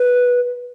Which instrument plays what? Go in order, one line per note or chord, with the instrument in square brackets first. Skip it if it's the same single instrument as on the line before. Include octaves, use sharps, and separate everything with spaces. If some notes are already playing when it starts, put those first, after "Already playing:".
Already playing: [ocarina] B4